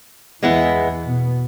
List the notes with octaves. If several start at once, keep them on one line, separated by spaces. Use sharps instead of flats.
E2 E3 G#3 B3 E4
B2 B3